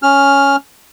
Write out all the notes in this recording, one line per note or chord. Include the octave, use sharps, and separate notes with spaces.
C#4 F6